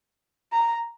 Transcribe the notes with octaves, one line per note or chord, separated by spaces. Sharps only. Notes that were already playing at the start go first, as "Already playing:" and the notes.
A#5